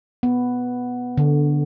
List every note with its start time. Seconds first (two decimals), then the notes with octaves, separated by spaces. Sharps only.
0.23 B3
1.18 D3